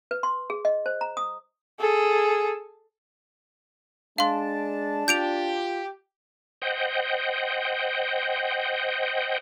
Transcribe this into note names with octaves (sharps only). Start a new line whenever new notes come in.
B4
C6
G#4
D#5
C5
A#5
D#6
G#4 A4
G#3 D4 F5 A5 C6
F4 G4 G6 D7 F7
C5 D#5 F#5 G5